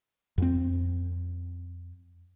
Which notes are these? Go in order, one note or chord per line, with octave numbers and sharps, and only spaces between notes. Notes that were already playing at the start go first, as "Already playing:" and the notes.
F2 C4